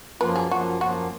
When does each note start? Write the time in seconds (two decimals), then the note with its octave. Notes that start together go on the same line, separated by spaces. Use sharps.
0.21 F#2 F3 A#3 F4 B4
0.36 G#4
0.51 F#2 F3 A#3 F4 F#4
0.81 F#2 F3 A#3 F4 F#4